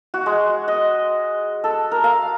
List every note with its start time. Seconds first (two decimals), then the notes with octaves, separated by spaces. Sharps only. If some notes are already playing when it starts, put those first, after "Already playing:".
0.14 F#4
0.26 G#3
0.68 D#5
1.64 A4
1.91 A#4
2.04 F5